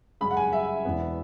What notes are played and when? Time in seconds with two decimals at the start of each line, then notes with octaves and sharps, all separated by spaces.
0.21 F#2 C#3 G#3 B5
0.31 F#5
0.37 G#5
0.53 E5
0.85 E1 E2 E3 B3